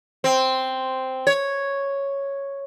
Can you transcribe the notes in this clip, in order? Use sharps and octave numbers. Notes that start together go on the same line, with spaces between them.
C4
C#5